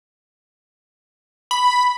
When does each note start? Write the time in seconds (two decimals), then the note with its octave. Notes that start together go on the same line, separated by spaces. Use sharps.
1.51 B5